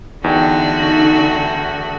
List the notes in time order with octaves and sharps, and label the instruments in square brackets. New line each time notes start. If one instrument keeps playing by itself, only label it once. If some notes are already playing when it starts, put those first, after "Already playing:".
[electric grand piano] E2 G5 [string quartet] D3 A3 F#4 [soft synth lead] D#4